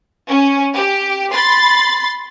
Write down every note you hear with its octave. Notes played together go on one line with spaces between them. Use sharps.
C#4
G4
B5 C6 A6